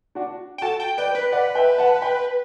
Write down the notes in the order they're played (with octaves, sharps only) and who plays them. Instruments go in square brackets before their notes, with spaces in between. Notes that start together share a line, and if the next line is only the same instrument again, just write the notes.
[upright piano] D4 F#4
[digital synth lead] G5
[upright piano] F#4 A4 [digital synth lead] A5
[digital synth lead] G5
[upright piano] B4 D5 [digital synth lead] G5
[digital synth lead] B4
[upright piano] D5 F#5
E5 G5
F#5 A5
G5 B5